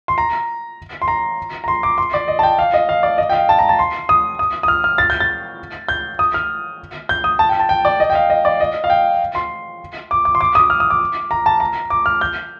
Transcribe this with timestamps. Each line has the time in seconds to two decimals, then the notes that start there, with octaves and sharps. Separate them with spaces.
0.08 C6
0.18 A#5
1.02 C6
1.08 A#5
1.64 A#5
1.68 C6
1.83 D6
1.98 C6
2.14 D5
2.28 D#5
2.39 A5
2.43 G5
2.59 F5
2.74 D#5
2.89 F5
3.03 D5
3.18 D#5
3.29 G5
3.33 F5
3.49 A5
3.59 A#5
3.69 A5
3.79 C6
4.09 D#6
4.39 D#6
4.63 D#6
4.68 F6
4.84 F6
4.98 A6
5.10 G6
5.20 A6
5.89 G6
6.19 D#6
6.34 F6
7.09 G6
7.24 D#6
7.39 A5
7.49 G5
7.60 A5
7.69 G5
7.85 D5
8.00 D#5
8.10 G5
8.15 F5
8.30 D#5
8.45 D5
8.60 D#5
8.84 F5
8.90 G5
9.35 C6
10.11 D6
10.25 D6
10.35 C6
10.41 D6
10.55 D#6
10.70 F6
10.80 D#6
10.90 D6
11.31 A#5
11.46 A5
11.60 A#5
11.90 D6
12.06 F6
12.21 G6